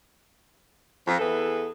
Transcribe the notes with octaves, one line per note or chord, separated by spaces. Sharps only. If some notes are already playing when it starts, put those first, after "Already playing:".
F2 F3
E2 E3 G#4 A4 B4